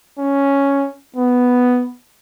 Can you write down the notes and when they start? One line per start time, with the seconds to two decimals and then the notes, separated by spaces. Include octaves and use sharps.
0.18 C#4
1.16 B3